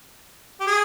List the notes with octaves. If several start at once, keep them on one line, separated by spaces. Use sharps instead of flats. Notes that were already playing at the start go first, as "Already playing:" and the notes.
G4
G#4